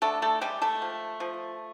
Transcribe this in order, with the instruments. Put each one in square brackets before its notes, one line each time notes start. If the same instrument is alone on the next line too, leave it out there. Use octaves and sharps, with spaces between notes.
[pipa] D3 A3 A4
A3 A4
G3 G#3 G4
A3 A4
F3
F3